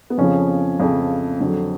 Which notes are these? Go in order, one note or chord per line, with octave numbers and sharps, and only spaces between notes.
B3
F2 C#3 F3 C#4
F2 C#3 F3
F2 D3 F#3